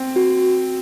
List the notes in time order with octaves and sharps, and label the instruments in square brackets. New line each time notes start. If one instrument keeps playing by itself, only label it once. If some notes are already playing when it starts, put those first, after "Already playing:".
Already playing: [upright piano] C4
[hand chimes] F#4